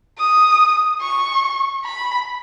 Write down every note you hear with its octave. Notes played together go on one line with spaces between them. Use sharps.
D#6
C#6
B5